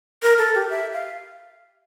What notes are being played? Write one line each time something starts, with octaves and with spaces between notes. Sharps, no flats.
A#4
A4
G4
E5
F5